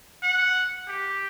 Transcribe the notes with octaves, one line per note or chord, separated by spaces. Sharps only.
F#5
G4